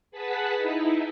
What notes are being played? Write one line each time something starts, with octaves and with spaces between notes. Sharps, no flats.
G#4 B4 F#5 A5 B6
D#4 E4